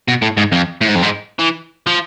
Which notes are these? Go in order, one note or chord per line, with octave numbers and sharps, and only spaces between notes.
B2
A2
G#2
F2
A2
G#2
F2
G#2
E3
F3